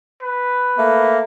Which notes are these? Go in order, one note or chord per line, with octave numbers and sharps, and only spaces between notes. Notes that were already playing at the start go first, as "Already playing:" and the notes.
B4
A3 A#3